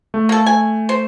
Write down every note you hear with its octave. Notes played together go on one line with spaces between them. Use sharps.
A3
A#3 A4
G#5
C5